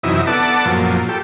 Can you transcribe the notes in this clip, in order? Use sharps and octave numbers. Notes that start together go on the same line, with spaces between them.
F#2 C3 E3 D#4 E4
B3 A4 D5 F#5 A5
F#2 A#2 F3
G4 A4